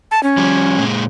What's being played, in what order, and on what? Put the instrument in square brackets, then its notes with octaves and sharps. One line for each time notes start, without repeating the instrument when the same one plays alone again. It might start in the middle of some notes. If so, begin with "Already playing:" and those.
[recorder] A5
C#4
[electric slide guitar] F3 G3
A#2 G#3